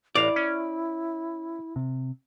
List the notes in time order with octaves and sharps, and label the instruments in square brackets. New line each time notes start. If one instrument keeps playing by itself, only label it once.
[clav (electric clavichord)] A1 F5 A#5 [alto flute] E4 [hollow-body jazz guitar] D5
[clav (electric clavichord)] C#4
[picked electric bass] C3